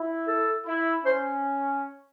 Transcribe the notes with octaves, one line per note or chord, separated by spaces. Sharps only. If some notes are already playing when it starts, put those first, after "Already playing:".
Already playing: E4
A4
E4
C#4 C5